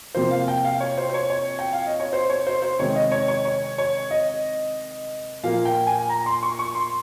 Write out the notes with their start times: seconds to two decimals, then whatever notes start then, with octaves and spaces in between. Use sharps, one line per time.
0.15 C3 F3 A#3 C5
0.31 F5
0.48 G5
0.65 F5
0.80 C#5
0.97 C5
1.10 C5
1.14 C#5
1.30 C#5
1.59 G5
1.73 F5
1.86 D#5
2.00 C#5
2.13 C5
2.30 C#5
2.47 C5
2.62 C5
2.79 C3 D#3 G#3 C#5
2.96 D#5
3.11 C#5
3.28 C#5
3.45 C#5
3.78 C#5
4.11 D#5
5.43 A#2 F3 A#3 F5
5.65 G5
5.87 G#5
6.09 A#5
6.26 C6
6.43 C#6
6.59 C#6
6.75 C6